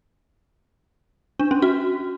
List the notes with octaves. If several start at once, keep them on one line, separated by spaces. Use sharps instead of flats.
D4
C#4
F#4